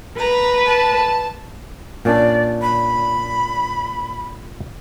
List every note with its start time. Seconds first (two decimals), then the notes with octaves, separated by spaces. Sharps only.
0.19 B4 A#5
0.66 A5
2.05 A#2 C#4 D4 D5
2.61 B5